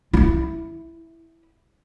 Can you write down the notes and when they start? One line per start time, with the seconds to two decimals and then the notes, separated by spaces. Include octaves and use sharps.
0.13 E4 F4